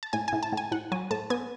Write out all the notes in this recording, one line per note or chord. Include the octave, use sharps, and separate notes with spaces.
A5
A2 G#5
G#5
A2
A5
A2
G#5
A2 F#5
F#3 G#5
A2 A5
B3 G#5